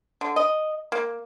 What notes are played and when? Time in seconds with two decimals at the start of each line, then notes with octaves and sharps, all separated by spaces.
0.21 D3
0.36 D#5
0.92 A#3